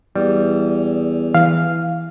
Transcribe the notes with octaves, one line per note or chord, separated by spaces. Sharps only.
E2 G3
E3 F5